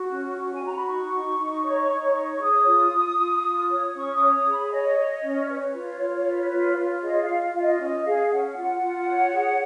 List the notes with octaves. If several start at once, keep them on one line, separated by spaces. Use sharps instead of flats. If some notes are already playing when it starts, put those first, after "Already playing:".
Already playing: F#4
C#4
F#4
G#5
F#4 A#5
B5
D#4 C#6
D#4
D#4
C#5
D#4
C#5
C#6
G#4 D#6
F4
F4
F4
F4
C#5
C#4 C#6
D#6
C#5
D#6
G#4
B5
C#5 D#5
C#5
C#4
D#5
B4 C#5
F4
F4
B4
F4
F4
G#4 D#5
F5
F4
F4 F5
D#5
C#4 D#5
G#4 F5
C#4 F#5
F4 F#5
F4
C#5
G#4